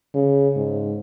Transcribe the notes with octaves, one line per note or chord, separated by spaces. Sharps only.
C#3
G#2